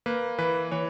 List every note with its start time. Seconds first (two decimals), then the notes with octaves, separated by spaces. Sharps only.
0.06 A#3 B4
0.39 E3 B4
0.71 E3 C#5